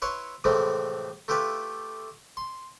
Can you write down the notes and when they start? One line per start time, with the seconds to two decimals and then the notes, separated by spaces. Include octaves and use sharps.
0.02 E4 B4 C#5 C6 C#6
0.44 A2 C3 E3 F3 G#3 A3
1.28 A3 E4 F4 G4 B4
2.37 C6